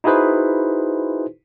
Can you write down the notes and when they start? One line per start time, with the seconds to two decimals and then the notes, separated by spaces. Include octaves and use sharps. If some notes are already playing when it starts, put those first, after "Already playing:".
0.04 D#4 E4 F#4 G#4 B4 C5